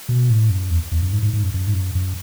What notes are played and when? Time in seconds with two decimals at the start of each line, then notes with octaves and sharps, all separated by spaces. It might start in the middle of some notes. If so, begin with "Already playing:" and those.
0.09 B2
0.30 A2
0.50 F#2
0.70 E2
0.92 E2
1.02 F#2
1.12 G#2
1.22 G#2
1.33 G#2
1.43 F#2
1.54 F#2
1.67 G#2
1.74 F#2
1.95 F#2